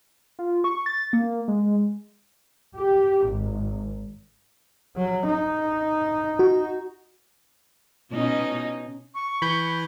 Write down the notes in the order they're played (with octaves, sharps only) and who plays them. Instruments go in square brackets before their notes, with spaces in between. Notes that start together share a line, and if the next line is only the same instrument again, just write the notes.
[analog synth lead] F4
C#6
A6
A#3
G#3
[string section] G4
G#1
[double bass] F#3
D#4
[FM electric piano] F#4
[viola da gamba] B2 C#4 D#4
[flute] C#6
[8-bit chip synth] E3 E4 [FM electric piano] B5 G6